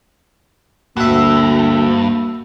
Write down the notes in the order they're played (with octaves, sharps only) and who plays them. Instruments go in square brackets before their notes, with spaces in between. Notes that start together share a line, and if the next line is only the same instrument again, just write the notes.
[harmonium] D2 [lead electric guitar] G2 [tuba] A#3 [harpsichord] F#4 E5